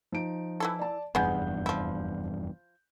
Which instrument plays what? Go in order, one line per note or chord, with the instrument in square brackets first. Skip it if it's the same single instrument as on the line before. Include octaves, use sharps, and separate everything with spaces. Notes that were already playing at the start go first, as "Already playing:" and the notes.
[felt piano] F3 D#4 D7
[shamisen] E3 E4 A4
[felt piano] D5 A5
[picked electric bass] F1 E2 G2 [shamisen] G#3 B3 [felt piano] F#5 G6
[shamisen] F3 E4